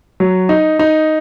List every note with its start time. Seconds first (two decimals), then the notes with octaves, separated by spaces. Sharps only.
0.20 F#3
0.49 D#4
0.79 D#4